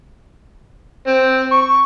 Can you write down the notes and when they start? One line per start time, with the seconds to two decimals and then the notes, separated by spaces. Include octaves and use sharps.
1.07 C4
1.52 C#6